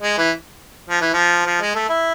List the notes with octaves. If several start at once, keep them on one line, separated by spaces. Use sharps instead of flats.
G#3
E3
F3
E3
F3
F3
G#3
A3
E4